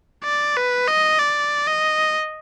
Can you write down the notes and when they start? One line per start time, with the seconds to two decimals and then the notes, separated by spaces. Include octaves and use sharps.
0.24 D5
0.57 B4
0.87 D#5
1.19 D5
1.67 D#5